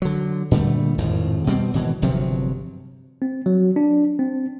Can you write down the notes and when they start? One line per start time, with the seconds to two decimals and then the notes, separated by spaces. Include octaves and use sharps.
0.02 D3 F#3
0.51 A#2 D3 G3 A3
0.98 G#1 F2 A2
1.47 B2 G3 C4
1.73 G#1 B2 E3
2.02 G1 C3 F3 F#3
3.22 C4
3.46 F#3
3.76 D4
4.19 C4